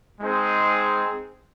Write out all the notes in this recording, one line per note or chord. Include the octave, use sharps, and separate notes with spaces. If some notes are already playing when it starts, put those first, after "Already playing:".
G#3 C4 D#4 G#4 C5